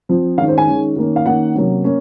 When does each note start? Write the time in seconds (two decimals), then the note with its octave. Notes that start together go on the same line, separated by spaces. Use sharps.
0.09 F3 C4
0.38 D#3 G#3 C#4 F5
0.48 C5
0.58 G#5
0.67 D#3 G#3 C#4
0.96 D#3 A#3 C#4
1.16 F5
1.26 D#3 A#3 C#4 F#5
1.55 C3 F#3 A#3 C#4
1.84 A#3 C#4